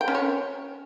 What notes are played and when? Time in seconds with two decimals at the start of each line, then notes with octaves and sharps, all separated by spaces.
0.01 G5
0.08 C#4
0.15 C#5